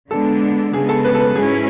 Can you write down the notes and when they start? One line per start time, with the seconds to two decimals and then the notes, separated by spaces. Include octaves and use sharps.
0.11 D3 G#3 B3 D4 A4
0.73 C#3 G#3 B3 G#4
0.89 A4
1.04 B4
1.14 A4
1.20 B4
1.36 G#2 F#3 C#4 E4 G#4